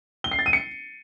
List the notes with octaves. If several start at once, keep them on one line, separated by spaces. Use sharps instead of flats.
G7
C7
A6
D#7
C#7